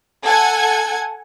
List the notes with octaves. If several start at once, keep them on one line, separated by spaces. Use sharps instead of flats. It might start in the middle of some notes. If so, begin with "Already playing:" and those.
A4 F#5 G#5 G#6